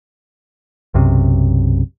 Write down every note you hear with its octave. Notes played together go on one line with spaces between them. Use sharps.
B1 F#2 C3